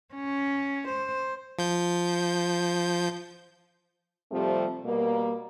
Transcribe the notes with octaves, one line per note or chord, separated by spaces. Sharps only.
C#4
C5
F3 G6
C3 F3 G3 A3 C4
B2 G3 A#3